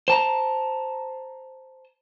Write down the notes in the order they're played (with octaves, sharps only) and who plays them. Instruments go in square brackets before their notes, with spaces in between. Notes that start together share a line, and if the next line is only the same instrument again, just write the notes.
[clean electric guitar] C5 A5 A#5